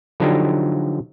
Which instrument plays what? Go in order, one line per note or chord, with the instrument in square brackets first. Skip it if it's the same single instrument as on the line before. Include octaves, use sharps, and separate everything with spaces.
[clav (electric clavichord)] D3 F3 F#3 D4 D#4 G4